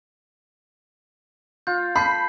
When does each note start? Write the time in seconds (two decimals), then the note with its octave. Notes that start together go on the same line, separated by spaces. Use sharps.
1.67 F4 G6
1.96 A5 B5 G6 C7